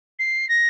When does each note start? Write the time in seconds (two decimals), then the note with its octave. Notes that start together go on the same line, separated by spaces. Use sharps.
0.19 C7
0.49 A#6